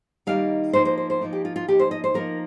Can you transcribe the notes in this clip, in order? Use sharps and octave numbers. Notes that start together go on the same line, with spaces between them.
D#3 G3 A#3 D#4 F5
F3 A#3 D#4 C5
C5
C5
C5
F3 A#3 D#4
G4
F4
F4
F3 A#3 D#4 G4
C5
D#5
C5
F3 A#3 D#4 A#4